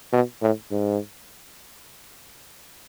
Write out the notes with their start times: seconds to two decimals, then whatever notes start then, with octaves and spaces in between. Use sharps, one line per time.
0.13 B2
0.42 A2
0.71 G#2